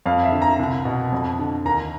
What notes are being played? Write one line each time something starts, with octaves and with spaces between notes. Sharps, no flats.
F2 F5
E5
D3
A#5
C2
B2
F2
D3
D#2 A#5